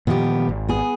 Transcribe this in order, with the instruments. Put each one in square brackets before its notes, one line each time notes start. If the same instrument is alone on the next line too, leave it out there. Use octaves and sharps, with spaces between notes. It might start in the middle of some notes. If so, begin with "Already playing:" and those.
[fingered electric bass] A#2 D#3 F3 [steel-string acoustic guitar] B3 G4
[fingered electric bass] G#1
[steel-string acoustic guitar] B3 G#4